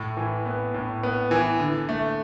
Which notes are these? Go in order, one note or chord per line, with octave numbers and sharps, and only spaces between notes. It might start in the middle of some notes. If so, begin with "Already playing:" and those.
Already playing: A2
E3
B3
A2
B3
E3
D3
A3